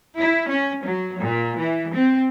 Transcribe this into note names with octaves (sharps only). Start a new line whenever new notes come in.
E4
C#4
F#3
A#2
E3
C4